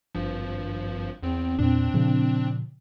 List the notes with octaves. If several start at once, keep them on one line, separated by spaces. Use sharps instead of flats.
G#1 G2 F3
E2 C4
E2 A#2 C4 D4
A#2 C#3 F3